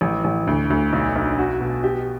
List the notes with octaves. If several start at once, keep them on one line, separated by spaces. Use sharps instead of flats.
A1
A1
D2
D2
B1
B1
F#4
B2
G4